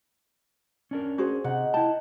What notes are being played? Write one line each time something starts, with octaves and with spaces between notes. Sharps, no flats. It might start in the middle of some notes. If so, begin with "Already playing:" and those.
C#4 D4 A#4
F#4 G#4 C5
C3 D#4 F#5
E4 G5 A5